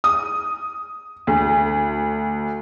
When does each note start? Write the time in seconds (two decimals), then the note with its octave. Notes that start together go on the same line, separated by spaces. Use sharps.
0.04 D#6
1.27 D2